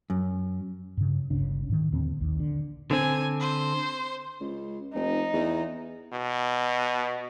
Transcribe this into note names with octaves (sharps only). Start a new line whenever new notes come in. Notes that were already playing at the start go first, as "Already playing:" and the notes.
F#2
G2 C#3
G1 C#2 C#3 D4
G#2 D#3
D#2 A#2 D3 C4
A#1 D#2
D3
D3 C4 G#5
C5
C#2
F1 D#4
E2
B2